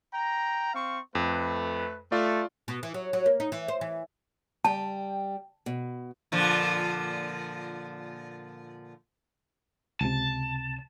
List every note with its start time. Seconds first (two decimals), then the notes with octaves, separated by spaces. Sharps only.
0.13 G5 A#5
0.74 C4 F5 C#6
1.15 F2 A3 B4
2.12 A3 F4 D5
2.68 B2
2.83 E3
2.94 F#3
3.13 F#3
3.26 A#3
3.40 D#4
3.52 E3
3.68 C5
3.81 E3
4.64 G3 G5 A5
5.66 B2
6.32 A#2 D3 F3
10.01 C#2 C3 A5